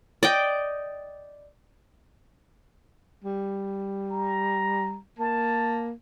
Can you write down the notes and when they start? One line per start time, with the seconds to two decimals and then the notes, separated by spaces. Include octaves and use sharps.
0.23 D5 D#5 G5
3.24 G3
4.12 A#5
5.19 A#3 A5